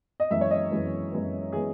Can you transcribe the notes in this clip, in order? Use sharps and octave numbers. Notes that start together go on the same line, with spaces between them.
D#5
F#2 E3 G#3 B3 E5
C#5
D#5
F#2 E3 G#3 B3
F#2 E3 G#3 B3
E3 G#3 B3 G#4